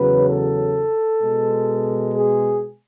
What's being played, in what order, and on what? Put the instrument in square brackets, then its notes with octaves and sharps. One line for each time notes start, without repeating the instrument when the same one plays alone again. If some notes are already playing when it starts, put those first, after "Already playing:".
Already playing: [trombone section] E2 C#3 F#3 B4
A4
B2 G#3
G#4